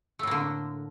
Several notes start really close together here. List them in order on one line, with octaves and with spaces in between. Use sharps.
A3 A2 A#3 D3